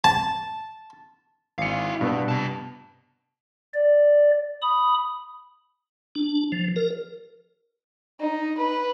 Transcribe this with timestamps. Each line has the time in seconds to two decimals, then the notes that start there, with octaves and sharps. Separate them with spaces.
0.04 A5
1.58 G#1 E4 F5 C#7
2.01 G2 B2 B3 B4
2.28 C3 A5
3.74 D5
4.62 B5 D#6
6.15 D4
6.52 F3
6.76 A#4
8.20 D#4
8.58 B4